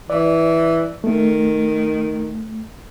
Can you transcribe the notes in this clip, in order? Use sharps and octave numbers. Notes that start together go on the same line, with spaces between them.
E3 D5
D#3 A3